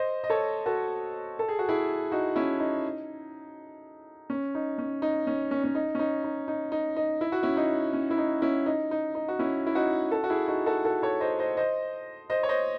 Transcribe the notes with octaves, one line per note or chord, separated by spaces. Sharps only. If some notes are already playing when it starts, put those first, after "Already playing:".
Already playing: C5 D#5
D#5
A4 C#5
F#4 A4
A4
G#4
F#4
E4 G#4
D#4 F#4
C#4 E4
D#4
C#4
D#4
C#4
D#4
C#4
C#4
C#4
D#4
C#4
D#4
D#4
D#4
D#4
D#4
E4
F#4
C#4 E4
D#4
C#4
E4
D#4
C#4 E4
D#4
D#4
D#4
F#4
C#4 E4
E4
D#4 F#4
F#4 A4
F#4
E4 G#4
D#4 F#4
F#4 A4
F#4 A4
A4 C#5
C5 D#5
C5 D#5
C5 D#5
C5 D#5
C#5
C5 D#5